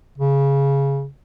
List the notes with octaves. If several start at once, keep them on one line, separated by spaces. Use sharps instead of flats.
C#3